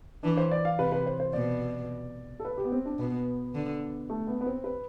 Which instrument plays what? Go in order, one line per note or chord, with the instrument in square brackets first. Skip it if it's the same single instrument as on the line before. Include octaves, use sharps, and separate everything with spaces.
[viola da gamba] E3 [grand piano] D4
[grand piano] C5
D5
F5
[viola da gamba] C3 [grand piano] B4
[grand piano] B4
C5
C5
[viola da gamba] B2 [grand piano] D5
[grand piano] A4
B4
G4
B3
C4
D4
[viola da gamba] B2 [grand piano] B3
[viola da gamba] D3
[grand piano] A3
B3
B3
C4
B4